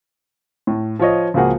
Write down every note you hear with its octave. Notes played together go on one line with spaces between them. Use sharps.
A2
F3 F4 C#5 D#5
C#2 F3 A#3 F#4 G#4 F#5